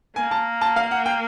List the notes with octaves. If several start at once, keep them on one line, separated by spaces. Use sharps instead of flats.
A#3 G#5
A5
A5
F5
F#5
G5